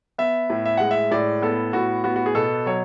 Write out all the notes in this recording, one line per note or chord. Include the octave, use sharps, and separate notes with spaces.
B3 E5
A2
E5
G#3 F#5
E5
A2 D5
B3 A4
A2 F#4
B3 F#4
F#4
G#4
B2 A4
F#3 C#5